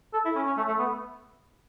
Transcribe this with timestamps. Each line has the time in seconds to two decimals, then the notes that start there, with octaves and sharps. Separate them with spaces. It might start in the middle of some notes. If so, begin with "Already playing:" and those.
0.13 A4
0.25 E4
0.35 C#4
0.46 C#4
0.57 A3
0.68 A3
0.79 B3